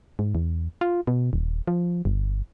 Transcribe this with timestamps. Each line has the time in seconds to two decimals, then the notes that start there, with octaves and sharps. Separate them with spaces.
0.19 G#2
0.35 E2
0.81 F4
1.07 B2
1.33 D#1
1.67 F3
2.05 G1